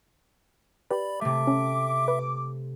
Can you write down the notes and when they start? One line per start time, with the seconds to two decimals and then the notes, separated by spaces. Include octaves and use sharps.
0.91 G4 B4 D5 B5
1.21 C3 A3 E5 D6
1.47 C#4
2.08 B4